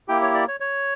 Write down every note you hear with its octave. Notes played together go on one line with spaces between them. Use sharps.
A#3 E4 G4 G5
C#5
D5
C#5
C#5